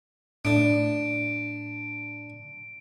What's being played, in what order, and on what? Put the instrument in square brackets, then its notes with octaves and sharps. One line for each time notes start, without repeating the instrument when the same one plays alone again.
[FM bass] A2 [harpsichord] D4 [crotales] D7